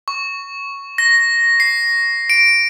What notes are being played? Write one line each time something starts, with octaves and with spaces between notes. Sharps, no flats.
C#6
A#6
C7
D7